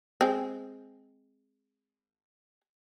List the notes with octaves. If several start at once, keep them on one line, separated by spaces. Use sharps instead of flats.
G#3 C4